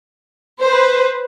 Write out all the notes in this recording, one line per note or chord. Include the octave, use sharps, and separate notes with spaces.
B4 C5